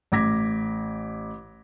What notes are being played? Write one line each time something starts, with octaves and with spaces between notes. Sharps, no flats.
A1 D6 G#6 A#6 B6